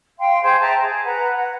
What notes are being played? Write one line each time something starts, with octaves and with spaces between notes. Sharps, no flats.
F5 G5 C6
G#4 C5 C6 G6
E5 G5 A5 A#5
G#4
B4 F#5 A#5
F#5